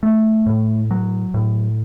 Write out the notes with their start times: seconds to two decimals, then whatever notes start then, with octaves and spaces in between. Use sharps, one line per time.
0.03 A3
0.46 A2
0.91 F#3
1.34 A2